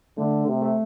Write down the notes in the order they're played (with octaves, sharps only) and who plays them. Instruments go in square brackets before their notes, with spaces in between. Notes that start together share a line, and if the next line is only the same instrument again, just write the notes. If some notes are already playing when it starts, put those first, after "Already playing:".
[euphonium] D3 [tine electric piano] A3
[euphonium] C3
[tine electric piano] A3